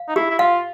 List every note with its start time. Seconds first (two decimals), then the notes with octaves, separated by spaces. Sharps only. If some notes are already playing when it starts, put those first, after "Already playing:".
Already playing: F5
0.09 D#4
0.16 E4 G4
0.30 E4
0.39 F4 F5